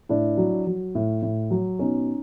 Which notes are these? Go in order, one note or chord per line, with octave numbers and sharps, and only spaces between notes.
A2 D4 E4
F#3
F#3
A2
A2
F#3
B2 C#4 D#4